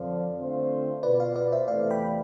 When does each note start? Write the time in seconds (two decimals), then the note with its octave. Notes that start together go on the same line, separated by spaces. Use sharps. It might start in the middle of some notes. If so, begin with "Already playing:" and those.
Already playing: F2 D3 F3 D5 F5
0.39 D3 A3 C4 F4 C5
1.03 B2 B3 F4 B4 D5
1.20 D5 F5
1.36 B4 D5
1.52 C5 E5
1.68 E2 C3 E3 A3 D5 F5
1.91 G5 B5